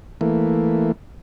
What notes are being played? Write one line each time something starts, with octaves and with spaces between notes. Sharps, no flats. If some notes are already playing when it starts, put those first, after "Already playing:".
E3 A3 A#3